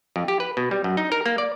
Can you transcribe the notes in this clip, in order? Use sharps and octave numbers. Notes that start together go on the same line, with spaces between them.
F2
G4
B4
B2
G3
F#2
D#4
A#4
A#3
D5